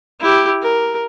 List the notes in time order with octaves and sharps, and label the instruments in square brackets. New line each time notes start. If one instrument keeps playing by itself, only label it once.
[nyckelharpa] E4 G4
A#4